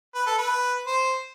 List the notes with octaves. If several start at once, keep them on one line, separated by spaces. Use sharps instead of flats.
B4
A4
B4
C5